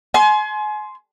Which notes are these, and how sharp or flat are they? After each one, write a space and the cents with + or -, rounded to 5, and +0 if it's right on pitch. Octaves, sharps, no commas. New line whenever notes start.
G#5 +35 C6 +0